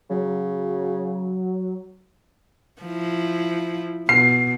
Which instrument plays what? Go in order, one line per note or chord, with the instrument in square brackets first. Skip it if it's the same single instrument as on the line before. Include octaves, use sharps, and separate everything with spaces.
[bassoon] C#3 [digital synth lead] F#3
[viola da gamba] F3 E4
[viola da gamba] B2 [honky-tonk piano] C7